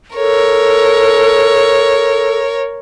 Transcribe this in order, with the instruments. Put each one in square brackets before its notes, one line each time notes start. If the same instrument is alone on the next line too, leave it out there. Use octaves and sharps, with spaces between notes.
[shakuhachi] A4 [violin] A#4 C#5